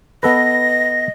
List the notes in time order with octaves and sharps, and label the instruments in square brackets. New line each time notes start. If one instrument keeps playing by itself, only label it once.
[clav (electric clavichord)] B3 A4 B4 [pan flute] D#5 [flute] A#6